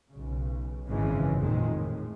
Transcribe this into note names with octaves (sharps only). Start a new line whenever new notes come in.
B1 C#3
G#1 F#2 C#3 E3 G#3
F2 A#2 D#3 G#3
A2